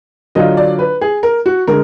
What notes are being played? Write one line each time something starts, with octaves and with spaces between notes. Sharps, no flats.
D3 F#3 D4 F4 D#5
D5
B4
G#4
A#4
F#4
D3 G#3 A#4